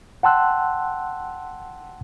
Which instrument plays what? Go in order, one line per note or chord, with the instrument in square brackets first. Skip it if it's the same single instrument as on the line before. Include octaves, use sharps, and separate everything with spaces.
[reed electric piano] F#5 G5 A5 C6 E6 F#6